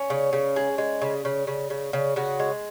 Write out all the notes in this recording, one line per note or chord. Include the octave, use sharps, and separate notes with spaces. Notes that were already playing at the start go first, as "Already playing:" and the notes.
Already playing: C#4
C#3
C#3
G#3
G#3
C#3
C#3
C#3
C#3
C#3
C#3 F#4
G#3